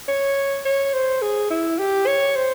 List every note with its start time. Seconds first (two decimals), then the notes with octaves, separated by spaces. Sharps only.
0.08 C#5
0.65 C#5
0.93 C5
1.22 G#4
1.50 E4
1.79 G4
2.07 C#5
2.36 C5